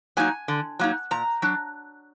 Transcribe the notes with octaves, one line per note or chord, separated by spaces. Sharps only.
F#3 A#3 D#4 G#5
D3
F#3 A#3 D#4
A#2 A#5
F#3 D4